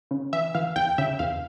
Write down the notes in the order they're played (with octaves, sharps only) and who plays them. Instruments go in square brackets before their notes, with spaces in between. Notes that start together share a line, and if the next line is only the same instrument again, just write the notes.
[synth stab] C#3
E3 E5
E3 F5
E2 G5
C#3 E5
E2 F5